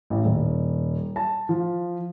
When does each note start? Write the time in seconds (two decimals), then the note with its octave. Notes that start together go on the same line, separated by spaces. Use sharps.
0.10 A1
0.25 D#1
1.16 A5
1.49 F3